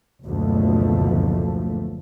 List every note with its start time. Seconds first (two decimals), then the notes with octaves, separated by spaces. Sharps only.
0.24 F#1 D2 B2 F3 A3